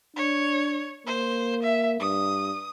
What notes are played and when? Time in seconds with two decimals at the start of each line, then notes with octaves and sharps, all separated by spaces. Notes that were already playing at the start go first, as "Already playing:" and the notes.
0.16 D4 C#5
1.07 A#3 C5
1.63 E5
2.00 G2 D#6